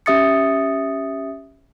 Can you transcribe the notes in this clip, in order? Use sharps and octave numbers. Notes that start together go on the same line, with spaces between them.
C#4 G4 E5 D#6 A6 C#7